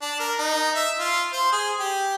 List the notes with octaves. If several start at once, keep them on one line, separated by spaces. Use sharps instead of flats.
D4
A#4
D#4
E5
F4
C5
G#4
G4